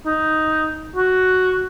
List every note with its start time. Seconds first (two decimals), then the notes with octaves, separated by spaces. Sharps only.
0.06 D#4
0.96 F#4